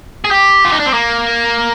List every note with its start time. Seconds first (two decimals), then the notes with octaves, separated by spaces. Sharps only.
0.25 G#4
0.31 G4
0.65 F4
0.72 D#4
0.80 D4
0.86 C4
0.93 A#3